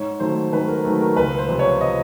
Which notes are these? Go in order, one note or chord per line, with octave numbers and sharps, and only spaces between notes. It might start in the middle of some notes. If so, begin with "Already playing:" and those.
Already playing: G#2 C#5
D#3 F#3 A3 C5
G#2 B4
A#4
D#3 F#3 A3
A#4
C#2 B4
C5
C3 F3
C#5
D#5